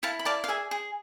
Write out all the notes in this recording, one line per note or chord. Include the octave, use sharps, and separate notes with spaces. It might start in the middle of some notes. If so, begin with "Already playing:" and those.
E4 F5 A5
B5
D5 F5 A5
F5
G#4 E5 G#5
G#4